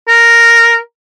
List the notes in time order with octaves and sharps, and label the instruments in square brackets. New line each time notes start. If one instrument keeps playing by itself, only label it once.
[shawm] A#4